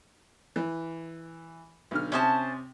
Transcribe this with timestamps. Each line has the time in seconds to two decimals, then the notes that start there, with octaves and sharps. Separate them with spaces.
0.56 E3
1.91 B1 D3 F6
2.12 C3 C#4 C5 A5 D#6